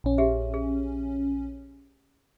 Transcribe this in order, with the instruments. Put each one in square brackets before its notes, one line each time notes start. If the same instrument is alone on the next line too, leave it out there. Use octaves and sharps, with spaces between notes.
[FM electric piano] A#1 C#4
[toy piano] G4 G#4 E5
G#4